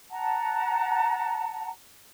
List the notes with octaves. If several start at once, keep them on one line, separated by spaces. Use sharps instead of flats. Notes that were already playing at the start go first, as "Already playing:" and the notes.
F#5 A5 A#5